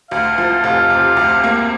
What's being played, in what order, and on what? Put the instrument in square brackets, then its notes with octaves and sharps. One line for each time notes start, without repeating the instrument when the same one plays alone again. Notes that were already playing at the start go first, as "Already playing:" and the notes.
[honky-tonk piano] D2 [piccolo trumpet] F5
[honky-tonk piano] F3
[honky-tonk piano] F1 [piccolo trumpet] F5
[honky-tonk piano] C3
D2
A#3